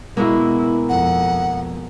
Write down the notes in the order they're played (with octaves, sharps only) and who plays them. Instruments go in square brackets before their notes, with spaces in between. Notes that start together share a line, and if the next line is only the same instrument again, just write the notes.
[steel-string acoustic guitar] B2 G#3 A#3 [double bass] E4
[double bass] F2 [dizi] F#5